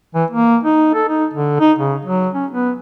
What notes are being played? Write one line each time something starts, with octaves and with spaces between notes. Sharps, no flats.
E3
A#3
D#4
A4
D#4
D3
D#4
C#3
F#3
C#4
B3